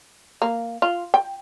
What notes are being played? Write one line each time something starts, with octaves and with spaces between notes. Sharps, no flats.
A#3
F4
G5